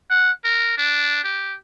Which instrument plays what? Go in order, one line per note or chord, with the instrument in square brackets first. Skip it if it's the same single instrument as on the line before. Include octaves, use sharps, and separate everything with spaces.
[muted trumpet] F#5
A#4
D4
G4